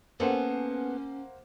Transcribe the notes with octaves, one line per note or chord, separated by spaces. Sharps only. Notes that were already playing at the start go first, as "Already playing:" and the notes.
A#3 B3 C#4 G#4 A4 C5 F#5